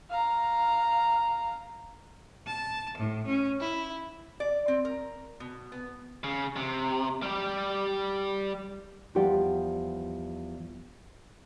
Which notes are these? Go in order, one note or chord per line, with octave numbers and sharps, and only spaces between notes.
F5 A#5
A5
A2
C#4
E4
D5
C4
A#4
B2
B3
C#3
C3
G3 G4
E2 F3 G3 G4 D5 F#5